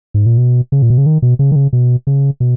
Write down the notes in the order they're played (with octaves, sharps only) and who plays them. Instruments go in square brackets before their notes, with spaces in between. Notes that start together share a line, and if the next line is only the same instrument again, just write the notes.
[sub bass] G#2
A#2
B2
C#3
A#2
B2
C#3
D#3
B2
C#3
D#3
C#3
B2
C#3
B2